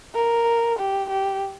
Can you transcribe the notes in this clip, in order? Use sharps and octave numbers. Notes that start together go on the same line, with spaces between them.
A#4
G4
G4